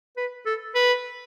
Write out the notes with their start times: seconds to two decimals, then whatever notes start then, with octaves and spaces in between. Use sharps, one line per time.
0.16 B4
0.45 A4
0.75 B4